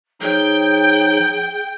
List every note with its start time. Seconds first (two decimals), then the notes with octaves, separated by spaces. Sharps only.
0.22 F3 D#4 G#4 C#5 G5